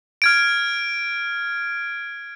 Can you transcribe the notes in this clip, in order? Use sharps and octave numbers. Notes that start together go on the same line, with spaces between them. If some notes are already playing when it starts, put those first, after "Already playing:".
F6 G#6 D7